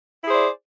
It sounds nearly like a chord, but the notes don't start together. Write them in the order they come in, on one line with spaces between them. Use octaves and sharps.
E4 G#4 C5 D5